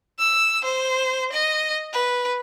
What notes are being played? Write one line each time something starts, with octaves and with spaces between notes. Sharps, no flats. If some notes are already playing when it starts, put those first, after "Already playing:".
E6
C5
D#5
B4